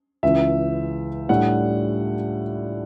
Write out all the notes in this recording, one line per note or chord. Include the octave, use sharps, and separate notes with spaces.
C#2 C#3 E3 E5
A2 G3 D4 F#5